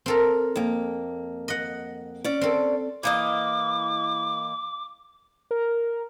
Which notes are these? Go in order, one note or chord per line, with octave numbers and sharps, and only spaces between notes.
C4 A4 A#4
F2 A#3
D#5 F#5
C#4 D5
C4 A4
E3 A#3 D#5 D6
A#4